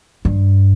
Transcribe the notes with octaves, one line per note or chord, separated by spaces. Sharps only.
G2